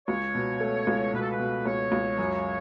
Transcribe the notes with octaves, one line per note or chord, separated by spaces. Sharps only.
C#2 C#5
B2
A3
C#2
B2 B4
A4
B4
B2
C#2 C#5
C#2
F#2